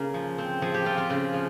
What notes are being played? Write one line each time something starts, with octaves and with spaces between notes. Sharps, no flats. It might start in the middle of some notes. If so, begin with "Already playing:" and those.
Already playing: C#3 A#3 A#4
F3
C4
F3 G#4
G4
C4 F4
F4
C#3
F3